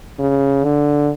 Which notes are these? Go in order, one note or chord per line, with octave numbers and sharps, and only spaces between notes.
C#3
D3